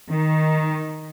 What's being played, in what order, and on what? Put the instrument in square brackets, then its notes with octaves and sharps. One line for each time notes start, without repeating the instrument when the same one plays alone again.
[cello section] D#3